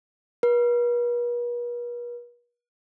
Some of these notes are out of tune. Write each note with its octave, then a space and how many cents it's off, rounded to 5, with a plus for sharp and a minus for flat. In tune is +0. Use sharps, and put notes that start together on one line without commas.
B4 -45